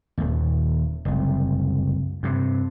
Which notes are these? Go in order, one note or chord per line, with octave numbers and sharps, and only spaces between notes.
D#1 D#2
F#1 C2
G2 C3